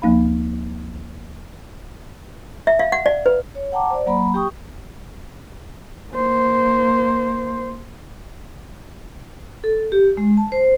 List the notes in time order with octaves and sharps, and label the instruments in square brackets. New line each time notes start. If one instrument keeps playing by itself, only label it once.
[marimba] D2 F3 A#3 D#4 F5 B5
[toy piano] E5
F5
F#5
D5
B4
[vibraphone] C#5
F#5 G5 A5 A#5 D6
C5 D5
F#3 A#3 A#5 B5
G4 G5 C#6 D#6
[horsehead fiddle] A#3 C5
[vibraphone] A4
G4
G#3
A5
C5